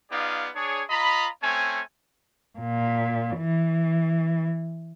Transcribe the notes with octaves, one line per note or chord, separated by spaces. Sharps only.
B3 D#4 F4 G#4 D5 F5
D4 G#4 C#5
F4 D#5 A#5 B5
A3 C4 C#4 C#5 G#5
A#2
E3